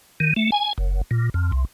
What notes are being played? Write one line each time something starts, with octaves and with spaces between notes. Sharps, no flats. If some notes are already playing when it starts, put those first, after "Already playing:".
D#3
A3
G#5
F#1
A#2
F2
C2